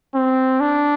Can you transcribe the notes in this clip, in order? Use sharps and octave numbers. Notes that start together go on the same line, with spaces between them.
C4
D4